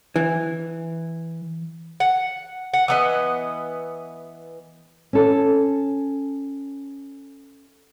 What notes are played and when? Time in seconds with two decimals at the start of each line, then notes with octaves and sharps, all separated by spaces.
0.16 E3
2.00 F#5
2.73 F#5
2.88 E3 B3 D#5
5.13 C#4 A4